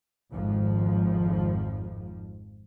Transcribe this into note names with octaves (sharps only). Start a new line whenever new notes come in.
G#1 F2 G#2 F3